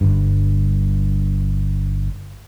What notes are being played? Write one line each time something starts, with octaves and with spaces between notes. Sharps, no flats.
G1 G2